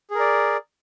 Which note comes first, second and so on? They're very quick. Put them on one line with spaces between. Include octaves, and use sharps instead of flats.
G#4 A#4 D5